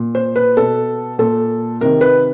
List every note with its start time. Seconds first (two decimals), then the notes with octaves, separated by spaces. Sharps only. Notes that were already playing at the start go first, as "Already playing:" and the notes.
Already playing: A#2
0.15 C5
0.36 B4
0.57 B2 A4
1.19 A#2 A4
1.81 C3 D#3 A#4
2.01 B4